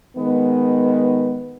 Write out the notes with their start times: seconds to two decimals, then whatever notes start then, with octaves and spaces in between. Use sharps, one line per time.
0.17 D#3 G#3 B3